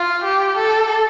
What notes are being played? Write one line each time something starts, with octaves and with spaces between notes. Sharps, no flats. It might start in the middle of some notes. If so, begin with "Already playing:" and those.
Already playing: F4
G4
A4